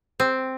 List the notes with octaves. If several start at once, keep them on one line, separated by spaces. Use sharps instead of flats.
C4